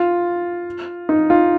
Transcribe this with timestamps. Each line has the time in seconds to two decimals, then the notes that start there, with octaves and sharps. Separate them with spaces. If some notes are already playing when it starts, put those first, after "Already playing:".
Already playing: F4
1.09 D#4
1.30 F4